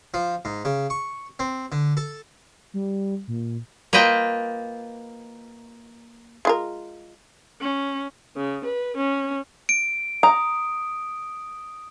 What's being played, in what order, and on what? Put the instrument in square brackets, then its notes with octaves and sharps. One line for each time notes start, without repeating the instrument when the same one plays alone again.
[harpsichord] F3
G#2
C#3
C#6
C4
D3
A4
[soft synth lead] G3
A#2
[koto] A#3 F4 B4 D#5 G5
[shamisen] G#3 F4 A#4
[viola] C#4
[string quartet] C#3
B4
C#4
[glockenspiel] D7
[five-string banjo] A#5 [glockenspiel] D#6